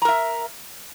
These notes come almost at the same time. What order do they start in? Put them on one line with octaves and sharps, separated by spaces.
A#5 A#4 E5